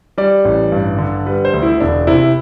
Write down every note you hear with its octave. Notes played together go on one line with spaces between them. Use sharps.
G3 D5
A1
G2
D3
G3 B4
C5
D2
E4
E1 D4
C3 E4